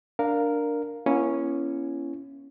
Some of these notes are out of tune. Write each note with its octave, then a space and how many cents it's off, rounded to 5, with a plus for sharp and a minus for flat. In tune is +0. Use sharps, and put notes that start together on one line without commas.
D4 +0 A#4 -5 F5 +0
A#3 +45 C#4 +0 E4 +30